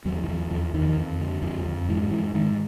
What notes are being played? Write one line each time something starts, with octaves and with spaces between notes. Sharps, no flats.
E2 F#3
E3
E2 F3
E2 F3
E2 D#3
F2
D3
F2 F3
F2
G#2 E3
G#2 E3
G#2 D#3